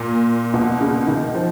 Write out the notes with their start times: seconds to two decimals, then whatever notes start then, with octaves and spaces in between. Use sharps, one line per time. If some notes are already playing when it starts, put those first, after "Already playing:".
Already playing: A#2
0.54 B2
0.81 C#3
1.07 D#3
1.35 F3